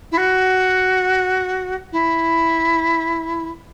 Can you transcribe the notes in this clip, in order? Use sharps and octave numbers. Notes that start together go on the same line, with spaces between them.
E4
F#4
E4